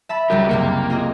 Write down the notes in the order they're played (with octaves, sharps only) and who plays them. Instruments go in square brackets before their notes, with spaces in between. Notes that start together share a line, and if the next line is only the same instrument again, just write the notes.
[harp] E5 A5 B5
[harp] C#2 G3 G4 [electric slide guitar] F#4 A#4
[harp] F#1 C2 C#7 [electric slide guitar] A#3
[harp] F4 G#4 D#5